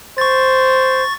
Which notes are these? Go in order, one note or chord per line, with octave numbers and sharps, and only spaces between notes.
C5 C#6 A6